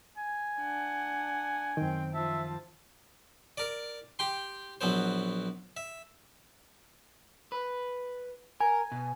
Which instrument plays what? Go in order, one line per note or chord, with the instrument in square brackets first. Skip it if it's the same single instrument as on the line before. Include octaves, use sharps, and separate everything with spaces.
[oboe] G#5
[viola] D4 F#5
[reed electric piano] F#2 D#3 [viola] C4 G5
[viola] F3 A5 [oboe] E5
[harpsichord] A#4 D5
G4 G5 C6
A#1 F#3 B3 C5
E5
[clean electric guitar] B4
[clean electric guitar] A#4 [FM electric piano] G#5
[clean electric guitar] B2